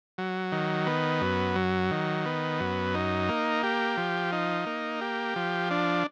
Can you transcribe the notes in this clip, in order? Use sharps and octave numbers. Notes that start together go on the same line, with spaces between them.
F#3
D#3
B3
F#2
F#3
D#3
B3
F#2
D#4
A#3
G4
F3
D#4
A#3
G4
F3
D4